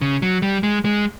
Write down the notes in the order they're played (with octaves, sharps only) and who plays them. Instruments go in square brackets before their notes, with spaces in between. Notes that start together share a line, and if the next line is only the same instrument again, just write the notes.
[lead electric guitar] C#3
F#3
G3
G#3
G#3